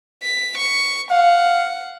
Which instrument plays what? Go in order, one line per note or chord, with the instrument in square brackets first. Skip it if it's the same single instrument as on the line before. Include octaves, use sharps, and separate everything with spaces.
[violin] B6
C#6
[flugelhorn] F5 [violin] F#5